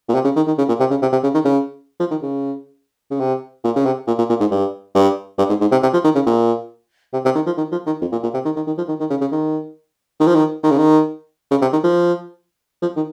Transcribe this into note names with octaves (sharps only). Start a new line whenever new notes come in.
A#2
C3
C#3
D#3
D#3
C#3
A#2
C3
C#3
C3
C3
C#3
D#3
C#3
F3
D#3
C#3
C#3
C3
A#2
C#3
C3
A#2
A#2
A#2
G#2
G2
G2
G2
G#2
G#2
C3
C3
F3
D#3
C#3
A#2
C3
C3
D#3
F3
D#3
F3
D#3
F2
A#2
A#2
C3
D#3
D#3
D#3
F3
D#3
D#3
C#3
C#3
D#3
D#3
F3
D#3
D#3
C#3
D#3
C#3
C3
D#3
F3
F3
D#3